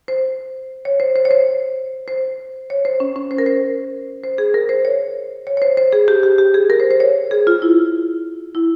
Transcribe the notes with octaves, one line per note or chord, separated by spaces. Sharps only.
C5
C#5
C5
C5
C#5
C5
C5
C#5
C5
C#4
C#4
C5
A#4
C5
C5
G#4
A#4
C5
C#5
C#5
C#5
C5
C5
G#4
G4
G4
G4
G#4
A#4
C5
C5
C#5
G#4
F4
E4
E4